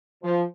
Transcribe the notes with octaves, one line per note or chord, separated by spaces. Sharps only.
F3